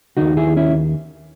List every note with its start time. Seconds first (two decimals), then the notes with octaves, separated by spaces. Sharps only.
0.17 D#2 D#3 D#4 F#4
0.37 E4 G#4
0.57 C#4 E4